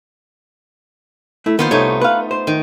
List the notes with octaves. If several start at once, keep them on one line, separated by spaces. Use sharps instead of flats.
A3 E4
D#3 A#3 B3 F4 C5
C2 A3 D#4 C#5
B4 F5
C5
D#3